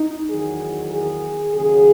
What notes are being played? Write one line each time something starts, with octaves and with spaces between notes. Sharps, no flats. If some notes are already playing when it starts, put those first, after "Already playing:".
Already playing: D#4
E2 D#3 F#3 G#4
G#4
D#2 C#3 F#3 G#4